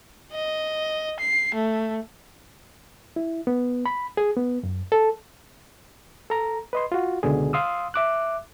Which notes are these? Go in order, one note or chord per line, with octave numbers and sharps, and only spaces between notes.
D#5
C7
A3
E4
B3
B5
G#4
B3
F#2
A4
A4 A#5
B4 D#5 C6
F4 F#4
C#2 B2 D3 G#4
F5 C6 D#6 E6
E5 D6 F#6